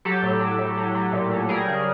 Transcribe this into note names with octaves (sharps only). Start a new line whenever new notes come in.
F#3 G4 A4
A2
F#3
A2
F#3
F#3
A#2
F#3
G3 G#4 A#4
C#3